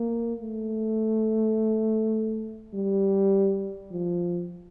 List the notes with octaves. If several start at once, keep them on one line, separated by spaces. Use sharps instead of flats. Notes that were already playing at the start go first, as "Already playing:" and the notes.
Already playing: A#3
A3
G3
F3